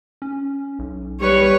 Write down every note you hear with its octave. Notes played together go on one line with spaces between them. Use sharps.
C#4
B1
G3 B4 C#5